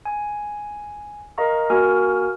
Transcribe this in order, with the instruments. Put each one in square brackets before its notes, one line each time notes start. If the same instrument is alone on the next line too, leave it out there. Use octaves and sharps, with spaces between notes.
[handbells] G#5
A#4 D#5 F5 A#5 C#6
A#3 F#4 A#4 G#5 F6